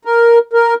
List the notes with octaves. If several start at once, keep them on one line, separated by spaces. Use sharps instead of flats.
A#4
A#4